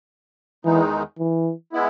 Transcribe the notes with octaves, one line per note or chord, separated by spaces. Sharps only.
E2 D#3 E3 G#3 D#4
E3
G#3 B3 E4